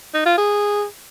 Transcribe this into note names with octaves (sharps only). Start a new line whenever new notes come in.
D#4
F4
G#4